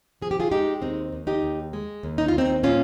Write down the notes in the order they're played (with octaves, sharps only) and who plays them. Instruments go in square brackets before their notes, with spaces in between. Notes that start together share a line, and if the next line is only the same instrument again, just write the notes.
[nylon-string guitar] F3 G#4
G4
F4 G#4
G#3 D#4 G4
D#2 C4 D#4
D#2
D#4 G4
D#2
G#3
D#2
D#4
D#2 F4
C4 D#4
A#2 C#4 F4